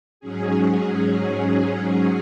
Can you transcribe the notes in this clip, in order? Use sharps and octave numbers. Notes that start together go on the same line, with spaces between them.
G#2 F#3 C#4 G#4
G#4